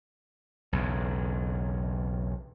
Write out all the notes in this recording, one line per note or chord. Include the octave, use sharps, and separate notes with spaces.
B1 E2 C#3